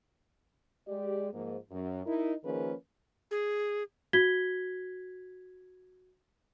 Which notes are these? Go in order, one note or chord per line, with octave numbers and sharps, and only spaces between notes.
G#3 G4 D5
G#2 F3 A#3
F#2
D#4 E4 A#4
D#3 F3 A#3 C#4 G#4 B4
G#4
F#4 G#6 B6 G7